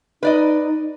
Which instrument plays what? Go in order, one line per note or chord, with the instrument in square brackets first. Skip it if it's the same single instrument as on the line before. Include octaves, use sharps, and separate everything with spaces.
[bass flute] D#4 [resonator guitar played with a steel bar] B4 D5 D#5